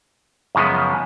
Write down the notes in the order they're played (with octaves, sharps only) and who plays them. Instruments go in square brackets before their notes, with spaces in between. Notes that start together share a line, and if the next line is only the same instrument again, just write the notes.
[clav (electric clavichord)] F#2 C#3 F3 G#3 B3